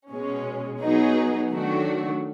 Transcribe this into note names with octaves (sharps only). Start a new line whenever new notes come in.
B2 G#3 C#4
F#3 B3 D#4 G#4
D#3 F#3 A3 D4 F#4